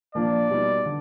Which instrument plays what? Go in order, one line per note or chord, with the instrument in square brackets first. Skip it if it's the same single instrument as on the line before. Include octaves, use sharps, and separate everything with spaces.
[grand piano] A#2 F3 A#3 D4 [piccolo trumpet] D5
[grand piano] B2 G3 B3 D#4
D3